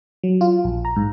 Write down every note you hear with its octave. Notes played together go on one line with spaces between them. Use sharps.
F#3
F4
A#1
A#5
G#2